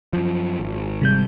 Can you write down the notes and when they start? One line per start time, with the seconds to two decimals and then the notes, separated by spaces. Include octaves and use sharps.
0.13 F#2 F3
0.60 G#1
1.02 C3 G3 G6